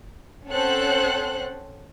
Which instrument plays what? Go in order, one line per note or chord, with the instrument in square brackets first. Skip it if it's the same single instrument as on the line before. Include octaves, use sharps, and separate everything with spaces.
[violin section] C4 C#4 A4 C5 F#5 F#6